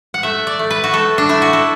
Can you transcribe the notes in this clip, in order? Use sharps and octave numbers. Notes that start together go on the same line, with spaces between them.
F#5
A3 E5
D5
A3
B4
F#4
A3 A4
D4
A3 E4
F#4
A4